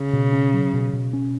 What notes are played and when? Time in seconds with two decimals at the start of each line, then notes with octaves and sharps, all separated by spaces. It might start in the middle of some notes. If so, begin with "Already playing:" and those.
Already playing: C#3
0.13 B2
0.33 C#4
0.53 F#3
0.73 B2
0.93 B2
1.13 C#4